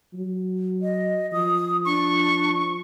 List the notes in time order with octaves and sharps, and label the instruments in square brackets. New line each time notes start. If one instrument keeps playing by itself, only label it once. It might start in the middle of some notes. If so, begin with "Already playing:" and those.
[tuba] F#3
[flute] D#5
[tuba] F3 [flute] D#6
[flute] D4 [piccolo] C#6